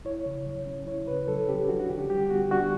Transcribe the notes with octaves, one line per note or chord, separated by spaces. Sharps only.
E4 C#5
C#3
F#3
C#4
E4 C#5
C#3 B4
F#3 A4
C#4 G4
D4 F#4
F#4
D3 G4
G3 G4
B3 F#4
D4 F#4